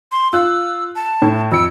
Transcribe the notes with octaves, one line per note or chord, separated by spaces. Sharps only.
C6
F4 E6 F#6
A5
A2
F2 E6 C#7 D7